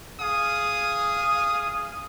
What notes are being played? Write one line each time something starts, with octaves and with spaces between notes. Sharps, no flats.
G#4 F5 D#6